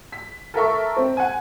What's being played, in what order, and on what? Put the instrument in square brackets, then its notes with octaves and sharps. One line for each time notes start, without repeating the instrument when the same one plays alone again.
[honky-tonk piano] B6
A4 A#4 E5 C#6
C4
F#5 G#5